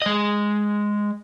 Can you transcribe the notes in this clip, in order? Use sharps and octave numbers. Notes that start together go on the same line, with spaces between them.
G#3 D#5